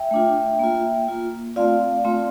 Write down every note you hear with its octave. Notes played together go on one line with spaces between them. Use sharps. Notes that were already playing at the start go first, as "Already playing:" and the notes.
Already playing: E5 G5
A3 D4 F4
A#3 F4
A#3 F4
A3 C4 F4 D5 F5
A3 C4 F4